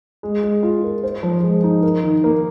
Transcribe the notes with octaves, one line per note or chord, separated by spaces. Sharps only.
G#3
G#3
F4
A#4
C5
F3
G#3
D#4
A#4
D#3
A#3